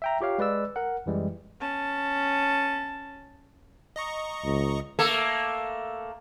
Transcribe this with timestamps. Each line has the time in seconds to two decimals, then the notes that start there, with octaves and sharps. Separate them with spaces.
0.02 E5 G5 A#5
0.21 F4 G4 C#5 F5
0.38 G#3 B4 D5 E6
0.76 A#4 F#5
1.06 F#2 E3 G3 G#3
1.60 C#4 A5
3.96 D#5 A#5 C#6
4.45 C#2
4.99 A3 A#3 A4